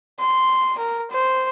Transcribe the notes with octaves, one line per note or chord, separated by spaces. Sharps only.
C6
A#4
C5